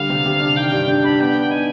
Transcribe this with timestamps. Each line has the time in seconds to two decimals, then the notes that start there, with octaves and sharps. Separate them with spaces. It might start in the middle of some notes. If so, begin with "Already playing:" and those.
Already playing: D3 G3 F5
0.10 C3
0.25 C3
0.40 D4
0.56 D#3 G5
0.72 G2
0.88 D4
1.03 D4 B5
1.19 B3 G5
1.35 B3
1.50 D#4 G#5